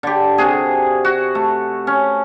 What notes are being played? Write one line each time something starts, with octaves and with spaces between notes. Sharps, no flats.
D3 G4
C3 F#4 G#4
F#4
A3
C#4